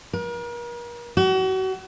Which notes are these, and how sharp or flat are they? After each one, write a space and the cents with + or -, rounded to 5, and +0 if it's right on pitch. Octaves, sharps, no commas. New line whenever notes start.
A#4 +40
F#4 +35